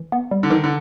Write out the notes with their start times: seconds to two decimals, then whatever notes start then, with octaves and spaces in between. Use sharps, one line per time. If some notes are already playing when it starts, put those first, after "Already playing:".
Already playing: E3
0.12 B3
0.31 G3
0.43 D3
0.50 D#3 E3
0.64 D3